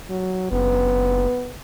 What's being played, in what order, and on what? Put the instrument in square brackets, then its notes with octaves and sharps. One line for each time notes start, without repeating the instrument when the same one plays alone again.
[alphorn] F#3
[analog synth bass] F#1 [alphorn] B3